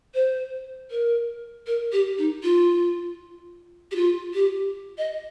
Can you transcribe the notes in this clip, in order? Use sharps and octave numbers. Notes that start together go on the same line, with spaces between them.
C5
A#4
A#4
G4
D#4
F4
G4
F4
G4
D#5